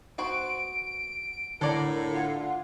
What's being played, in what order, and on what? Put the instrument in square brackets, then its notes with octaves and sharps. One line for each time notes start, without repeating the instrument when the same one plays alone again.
[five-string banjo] B3 F#4 C5 [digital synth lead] D7
[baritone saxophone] A2 [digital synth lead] D3 [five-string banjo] A4 D5 A#5 [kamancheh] A#4
[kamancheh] F4 F#5